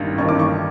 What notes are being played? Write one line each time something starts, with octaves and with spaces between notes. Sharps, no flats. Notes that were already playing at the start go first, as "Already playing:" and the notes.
Already playing: A1 G2 D#3
A1 G2 D#3 C#6
D6
C#6